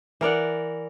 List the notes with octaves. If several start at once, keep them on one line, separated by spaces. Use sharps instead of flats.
E3 A#4 D5 F#5